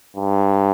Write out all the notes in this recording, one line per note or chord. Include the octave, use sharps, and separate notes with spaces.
G2